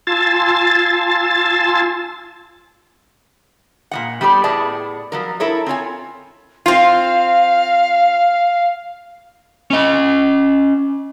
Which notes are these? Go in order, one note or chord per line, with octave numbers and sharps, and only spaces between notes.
F4 G#5 A5 C6 E6 A6
A#2 G#3 F#5
G3 B3 G4 A4 C5 D5
A2 B3 G#4 D5 A5
F3 F#3 A#4
E4 A4 A#4 C#5
C4 F4 C#5 G#5
C4 F4 F5
C#4 D#5